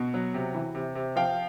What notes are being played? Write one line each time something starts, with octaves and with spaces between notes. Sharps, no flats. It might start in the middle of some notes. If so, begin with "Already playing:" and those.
Already playing: B2
F#3
C3
E3
C3
C3
F3 F5 G5